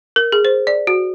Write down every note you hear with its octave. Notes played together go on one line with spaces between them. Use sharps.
A#4
G#4
C5
D5
F#4